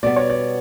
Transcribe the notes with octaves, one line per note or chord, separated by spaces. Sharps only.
B2 G3 B3 D5
C#5
D5